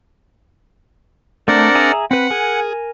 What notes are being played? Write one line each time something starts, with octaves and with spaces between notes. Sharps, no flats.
A3 C4 D4 A4 A#4 D5 F#5
G#4 E5 A#5
C4 B4 F#5 B5
G#4 A#4 G#5